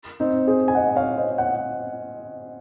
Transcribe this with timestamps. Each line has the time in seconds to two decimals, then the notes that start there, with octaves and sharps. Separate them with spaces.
0.20 C4 D#4
0.48 G#4 C5
0.68 G#5
0.75 D#5 F#5
0.96 C#5 F5
1.17 C5 D#5
1.38 F#5